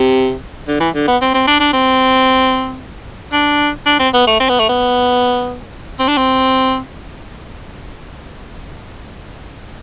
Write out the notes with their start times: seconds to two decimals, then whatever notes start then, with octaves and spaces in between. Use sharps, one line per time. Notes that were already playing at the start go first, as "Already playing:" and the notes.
Already playing: C3
0.68 D3
0.80 E3
0.95 D3
1.07 B3
1.21 C4
1.34 C4
1.47 D4
1.60 D4
1.73 C4
3.33 D4
3.86 D4
3.99 C4
4.14 B3
4.27 A3
4.40 C4
4.49 B3
4.59 A3
4.69 B3
5.99 C4
6.08 D4
6.17 C4